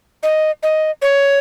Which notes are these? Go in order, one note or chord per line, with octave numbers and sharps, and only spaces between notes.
D#5
D#5
C#5